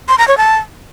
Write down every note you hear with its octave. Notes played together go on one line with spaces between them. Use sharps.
C6
A#5
C#5
A5